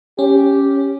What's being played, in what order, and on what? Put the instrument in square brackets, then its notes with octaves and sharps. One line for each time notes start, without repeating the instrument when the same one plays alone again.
[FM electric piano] C#4 [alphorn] G4